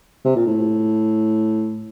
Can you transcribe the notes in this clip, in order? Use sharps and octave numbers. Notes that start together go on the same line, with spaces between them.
C3
A#2
A2